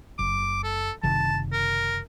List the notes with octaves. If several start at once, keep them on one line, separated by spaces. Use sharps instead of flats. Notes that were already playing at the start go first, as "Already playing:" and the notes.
F#1 D6
A4
F#1 C3 D#3 A5
A#4